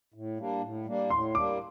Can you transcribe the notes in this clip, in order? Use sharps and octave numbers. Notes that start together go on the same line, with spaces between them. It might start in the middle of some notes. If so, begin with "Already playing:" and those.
A2
G3 A#3 D4
A2
G3 A#3 D4
A2 C6
G3 A#3 D4 D6